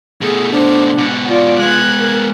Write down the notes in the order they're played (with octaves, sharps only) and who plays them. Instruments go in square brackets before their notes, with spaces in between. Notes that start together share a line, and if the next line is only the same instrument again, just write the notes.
[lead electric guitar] B2 A3 [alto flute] G#4
[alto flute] D4 [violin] C5
[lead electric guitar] G#2 B2 [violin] F#5
[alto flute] F4 [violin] D5
[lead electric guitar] G#3 B3 [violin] F#6 G#6
[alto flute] A#4